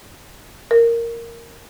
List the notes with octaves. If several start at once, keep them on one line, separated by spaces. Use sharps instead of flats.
A#4